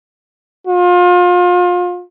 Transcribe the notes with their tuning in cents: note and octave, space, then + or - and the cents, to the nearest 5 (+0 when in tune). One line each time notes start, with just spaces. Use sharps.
F4 +30